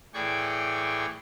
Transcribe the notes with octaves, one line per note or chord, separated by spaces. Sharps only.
A2 E3 G#4 D5 G5 C#6